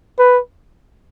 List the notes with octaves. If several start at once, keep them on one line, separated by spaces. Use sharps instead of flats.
B4